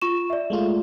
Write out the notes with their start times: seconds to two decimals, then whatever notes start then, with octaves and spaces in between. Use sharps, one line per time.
0.02 F4 C#6 E7
0.30 D5 E5
0.50 G#3 A3 F4